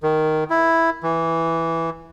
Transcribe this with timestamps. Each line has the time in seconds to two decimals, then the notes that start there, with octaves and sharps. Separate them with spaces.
0.03 D#3
0.50 E4
1.03 E3